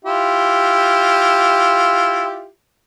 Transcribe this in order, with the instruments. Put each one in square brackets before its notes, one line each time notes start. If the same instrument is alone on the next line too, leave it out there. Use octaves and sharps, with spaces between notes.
[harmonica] E4 F4 G4